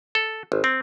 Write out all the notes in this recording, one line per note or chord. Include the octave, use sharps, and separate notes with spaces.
A4
G#1
C4